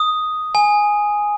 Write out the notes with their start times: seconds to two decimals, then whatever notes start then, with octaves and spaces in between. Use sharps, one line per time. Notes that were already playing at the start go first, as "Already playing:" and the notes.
Already playing: D#6
0.55 G#5